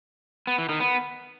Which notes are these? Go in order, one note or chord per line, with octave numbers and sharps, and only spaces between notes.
B3
E3
D#3
B3